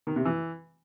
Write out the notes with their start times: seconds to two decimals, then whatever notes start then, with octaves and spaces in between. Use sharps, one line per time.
0.07 D#3
0.16 C3
0.25 E3